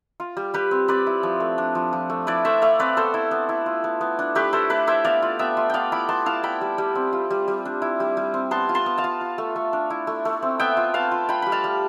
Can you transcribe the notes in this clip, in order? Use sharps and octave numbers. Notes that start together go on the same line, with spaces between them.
F4
G3
G3 G4 B4
C4
C4 B4 D5
E4
F3
A3
D4
F3
F3
A3
E4 B4 D5
A3 C5 E5
A3 D5 F5
C4 B4 D5
B3 A4 C5
E4
B3
E4
F4
B3
B3
D4
A3 G4 B4
E4 A4 C5
A3 B4 D5
E4 C5 E5
B3 D5 F5
F4
B3 E5 G5
F4
B3 D5 F5 G5
E4 B5 D6
B3 A5 C6
E4 F5 A5
E4 G5 B5
G3
G3
C4
F4
G3
G3
D4
E4
G3
G3
C4
B3 A5 C6
F4
A5 C6
B3
F5 A5
F4
F4
A3
A3
D4
E4
A3
A3
C4
B3 E5 G5
F4
B3 F5 A5
F4
F4 G5 B5
G3 B5
F5 A5
G3